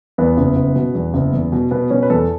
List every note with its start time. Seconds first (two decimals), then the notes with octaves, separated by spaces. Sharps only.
0.18 E2 B3
0.37 F#1
0.56 F#1
0.75 B2
0.95 E2
1.14 F#1
1.33 E2
1.52 B2
1.71 B2 B3
1.90 B2 C#4
2.03 B4
2.10 E2 A4